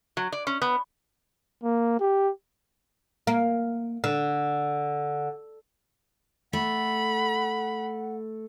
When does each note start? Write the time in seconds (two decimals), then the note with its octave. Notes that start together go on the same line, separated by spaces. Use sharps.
0.17 F#3
0.32 D5
0.47 C#4
0.62 B3
1.63 A#3
2.00 G4
3.27 A#3
4.04 D3
6.53 A3 F#5 B5